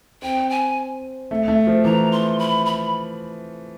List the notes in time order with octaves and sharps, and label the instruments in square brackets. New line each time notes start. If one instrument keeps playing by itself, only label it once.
[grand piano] C4 [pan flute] G5
[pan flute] G#5
[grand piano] A3
A3
F3
[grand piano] E3 [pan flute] A#5
[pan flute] C6
B5
B5